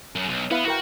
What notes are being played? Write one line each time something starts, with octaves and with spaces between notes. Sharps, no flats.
F#2
B1
B3 E4 B4 F5
E4 F#4 A#4 G5